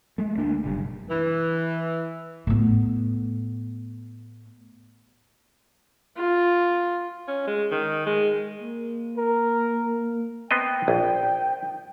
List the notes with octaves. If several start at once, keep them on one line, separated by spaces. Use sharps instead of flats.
G#3 A3
D2 A#3 D4
F#1 B1 G2
E3
A2 B3
F4
C#4
G#3
D#3
G#3
A#3
A#4
B3 C4 D#5 G5
A#1